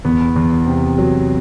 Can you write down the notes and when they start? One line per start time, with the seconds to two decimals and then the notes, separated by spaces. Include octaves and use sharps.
0.05 E2 B3
0.36 E2
0.67 C3
0.98 F#3